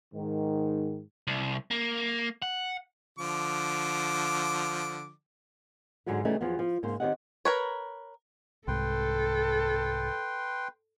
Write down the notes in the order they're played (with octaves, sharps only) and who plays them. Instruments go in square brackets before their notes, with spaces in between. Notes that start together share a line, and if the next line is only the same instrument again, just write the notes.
[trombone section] G#2 D#3
[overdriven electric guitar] C2
A#3
F#5
[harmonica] D3 F3 D6
[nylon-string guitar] G#2 D3 F#3 F#4 B4
C#3 E3 G3 A3 C#4 D#4
E2 F3 F#3 B3
F3
G#2 C#3 A#3 C5
D#3 C4 G4 C#5 D#5 F#5
[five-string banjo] A#4 B4 C#5
[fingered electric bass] C2 G#2 [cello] A4 [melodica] B4 G5 C6